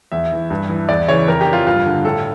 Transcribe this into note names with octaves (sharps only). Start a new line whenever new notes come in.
E2 E5
E3
G2
E3
E2 D5
C#3 E3 C#5
F2 A#4
G4
E3
F4
G2 F4
D3
A2 A4